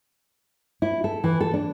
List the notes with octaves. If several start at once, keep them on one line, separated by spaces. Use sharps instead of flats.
E4
A4
E3
A4
D4